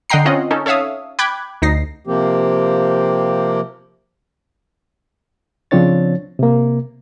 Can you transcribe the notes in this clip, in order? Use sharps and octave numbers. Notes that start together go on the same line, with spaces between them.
D3 D#5 F#5 G5 A#5 C7
C4 C#4 F4 C#5 D#5 F#5
C#4 D#4 A4
A4 C#5 E5 F5 D#6
G5 B5 D6 F#6 G#6
D2 D#4 A#6 C7
C3 F3 A#3 C4 G4
C#3 F3 C4 D4 C#5 A6
C3 A#3